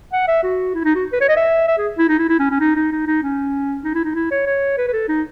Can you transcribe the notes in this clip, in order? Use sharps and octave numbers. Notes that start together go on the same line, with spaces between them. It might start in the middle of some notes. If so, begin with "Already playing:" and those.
F#5
E5
F#4
E4
D#4
F#4
B4
C#5
D#5
E5
E5
G#4
E4
D#4
E4
E4
C#4
C#4
D#4
D#4
D#4
D#4
C#4
D#4
E4
D#4
E4
C#5
C#5
B4
B4
A4
D#4